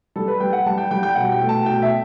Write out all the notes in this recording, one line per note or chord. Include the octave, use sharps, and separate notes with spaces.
G3 A4
B4
G3 G5
F#5
G3 A5
G5
G3 G5
G5
B2 F#5
G5
A3
A5
B2 G5
E5